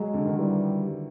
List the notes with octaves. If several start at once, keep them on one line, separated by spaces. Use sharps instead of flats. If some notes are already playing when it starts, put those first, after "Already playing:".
Already playing: F#3 G#3
D3
D#3
E3 G3